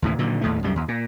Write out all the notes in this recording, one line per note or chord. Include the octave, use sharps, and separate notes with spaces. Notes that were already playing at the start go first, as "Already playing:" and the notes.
D#2 A2 C#3 E3
A#2 D3 D#3 F#3
D#2 A2 A3
C2 F#2 G3
D#2
A#2